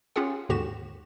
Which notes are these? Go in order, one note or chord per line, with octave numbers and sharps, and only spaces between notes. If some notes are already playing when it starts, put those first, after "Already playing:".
C#4 F4 G4 G#4 F#5
D#2 G#2 D3 F#4 G4 E7